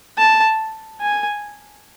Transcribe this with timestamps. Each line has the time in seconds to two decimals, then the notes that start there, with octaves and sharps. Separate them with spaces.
0.18 A5
1.01 G#5